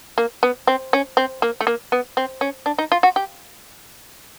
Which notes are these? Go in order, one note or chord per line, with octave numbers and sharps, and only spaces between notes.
A#3
B3
C4
C#4
C4
A#3
A3
A#3
B3
C4
C#4
D4
D#4
F4
F#4
G4